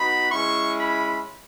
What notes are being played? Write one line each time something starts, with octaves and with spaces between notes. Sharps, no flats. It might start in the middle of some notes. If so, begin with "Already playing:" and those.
Already playing: B3 D#4 F#4 B5
G#3 C#4 E4 C#6
B5